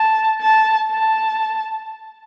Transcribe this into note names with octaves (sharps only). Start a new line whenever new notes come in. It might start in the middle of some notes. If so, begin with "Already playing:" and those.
Already playing: A5
A5
A5